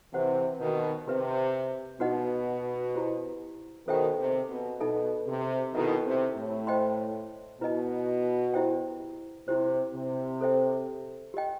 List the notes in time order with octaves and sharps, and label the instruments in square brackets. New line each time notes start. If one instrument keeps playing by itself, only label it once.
[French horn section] C3 E3 [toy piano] G4 C5 F#5
[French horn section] B2 D#3
[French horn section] C3 [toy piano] G4 B4 E5
[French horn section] B2 [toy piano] D#4 F#4 B4 D#5 F#5
[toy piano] E4 G4 C5
[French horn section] B2 D#3 [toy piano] A4 C5 E5 G5
[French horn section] C3
B2
[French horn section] B2 [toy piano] D#4 A4 E5 A5
[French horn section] C3
[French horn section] B2 D#3 [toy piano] E4 A4 E5
[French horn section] C3
A2
[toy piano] C5 D#5 G5 C6
[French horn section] B2 [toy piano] E4 B4 D#5 A5
[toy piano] E4 G4 C5 E5 G5
[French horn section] C3 [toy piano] E4 G4 C5
[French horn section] C3
[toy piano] A4 C5 E5 G5
G4 D#5 G5